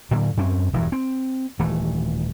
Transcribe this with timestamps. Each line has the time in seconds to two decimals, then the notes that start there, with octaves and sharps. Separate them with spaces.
0.11 A2 D3 F#3 A#3
0.37 F#2 C4 C#4
0.73 E1 G2 E3
0.92 C4
1.59 D#1 E3 A3